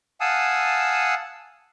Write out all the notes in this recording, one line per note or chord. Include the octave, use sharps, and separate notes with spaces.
F5 F#5 G#5 A5 D#6 E6